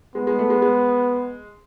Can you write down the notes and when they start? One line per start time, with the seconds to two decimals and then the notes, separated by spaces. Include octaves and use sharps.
0.15 G#3 B3
0.27 G#3
0.39 A3
0.50 G#3
0.62 G#3